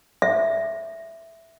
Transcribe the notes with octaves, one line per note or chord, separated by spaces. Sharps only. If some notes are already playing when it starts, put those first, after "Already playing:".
E5